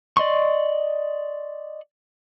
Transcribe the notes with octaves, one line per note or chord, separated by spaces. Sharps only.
D5 D#5 C6 C#6